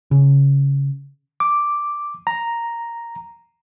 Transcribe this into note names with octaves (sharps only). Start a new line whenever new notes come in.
C#3
D6
A#5